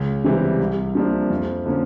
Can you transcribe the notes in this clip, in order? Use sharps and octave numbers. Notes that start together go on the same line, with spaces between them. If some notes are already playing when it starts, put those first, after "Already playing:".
Already playing: C#2
C3 E3 G3
C2
C3 F3 A#3 D4
F2
D3 F3 A#3 C#4